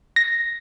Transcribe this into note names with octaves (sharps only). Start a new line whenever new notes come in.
A#6